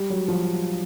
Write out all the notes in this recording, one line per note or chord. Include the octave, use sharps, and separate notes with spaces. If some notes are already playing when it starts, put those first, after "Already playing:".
Already playing: G3
F#3
F3